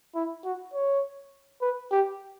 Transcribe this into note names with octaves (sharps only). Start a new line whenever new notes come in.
E4
F#4
C#5
B4
G4